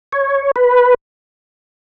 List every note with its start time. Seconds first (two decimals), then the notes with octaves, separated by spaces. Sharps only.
0.12 C#5
0.56 B4